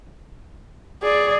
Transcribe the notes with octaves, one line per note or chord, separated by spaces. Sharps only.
G#4 D5